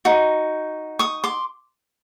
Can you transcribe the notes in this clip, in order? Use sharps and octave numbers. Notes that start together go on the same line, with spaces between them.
D#4 F#4
C#6 D#6
C6 D6